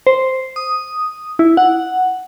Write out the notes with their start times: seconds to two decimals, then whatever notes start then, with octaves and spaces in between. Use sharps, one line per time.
0.07 C5
0.56 D#6
1.39 E4
1.57 F#5